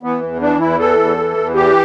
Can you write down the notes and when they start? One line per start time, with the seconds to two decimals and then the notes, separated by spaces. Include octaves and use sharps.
0.03 E3 B3
0.23 E2
0.41 E3 D4
0.60 E2 E4
0.79 E3 A4
0.99 E2
1.18 E3
1.37 E2
1.55 E3 G4